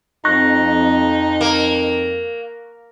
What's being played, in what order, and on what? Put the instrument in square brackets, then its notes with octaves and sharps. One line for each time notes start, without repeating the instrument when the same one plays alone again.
[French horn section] F2 [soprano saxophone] D#4 [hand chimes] C#6 F#6 A#6
[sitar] A#3